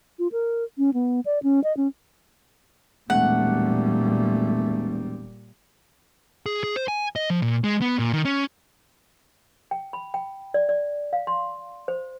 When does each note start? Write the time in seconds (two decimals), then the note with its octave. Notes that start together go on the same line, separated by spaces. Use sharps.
0.19 F4
0.32 A#4
0.78 C#4
0.94 B3
1.26 D5
1.43 C#4
1.64 D#5
1.77 C#4
3.10 E1 A#2 G3 A3 F#5
6.46 G#4
6.64 G#4
6.76 C5
6.88 G#5
7.16 D#5
7.30 F3
7.42 A#2
7.64 G#3
7.81 B3
7.99 A#2
8.13 D#3
8.25 C#4
9.71 G5
9.93 B5
10.14 G5
10.54 D5
10.69 D5
11.13 F5
11.27 C6
11.88 C5